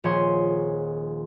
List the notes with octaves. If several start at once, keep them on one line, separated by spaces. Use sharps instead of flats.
D#1 F3 G#4 C#5 C6